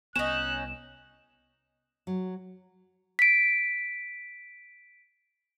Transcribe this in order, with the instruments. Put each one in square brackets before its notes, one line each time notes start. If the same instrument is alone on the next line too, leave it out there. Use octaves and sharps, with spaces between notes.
[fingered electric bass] C2 B3 [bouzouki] C#4 D#4 [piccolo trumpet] F#6 [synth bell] E7
[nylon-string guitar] F#3
[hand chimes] B6 D7